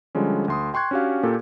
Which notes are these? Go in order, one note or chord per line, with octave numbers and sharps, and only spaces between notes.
D3 F3 G3 G#3 C#4
D2 C6 D#6
G5 C6 C#6 F#6 G#6
C#4 D4 F#4 G4 F5
A#2 A#3 G4 A4